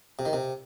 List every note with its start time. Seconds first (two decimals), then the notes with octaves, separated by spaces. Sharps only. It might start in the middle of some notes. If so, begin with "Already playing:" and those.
0.19 C3
0.25 D#3
0.33 C3